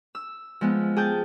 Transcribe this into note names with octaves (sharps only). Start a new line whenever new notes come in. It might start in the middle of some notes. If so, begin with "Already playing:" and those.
E6
F3 G#3 B3
G#4 G5 A5 G6